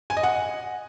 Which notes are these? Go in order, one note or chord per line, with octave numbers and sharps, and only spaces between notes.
G#5
D#5
F#5